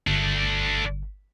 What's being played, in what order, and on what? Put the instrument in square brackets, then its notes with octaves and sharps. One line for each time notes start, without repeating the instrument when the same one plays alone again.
[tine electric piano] G1 [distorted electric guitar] A3 D4